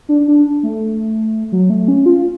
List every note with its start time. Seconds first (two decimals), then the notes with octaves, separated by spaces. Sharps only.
0.09 D4
0.28 D4
0.63 A3
1.52 F#3
1.70 A3
1.88 C#4
2.06 F4